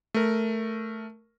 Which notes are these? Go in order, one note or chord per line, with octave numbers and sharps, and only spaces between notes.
A3 A#4